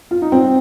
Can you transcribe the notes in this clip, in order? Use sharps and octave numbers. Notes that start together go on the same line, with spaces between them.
F4
D#4
C4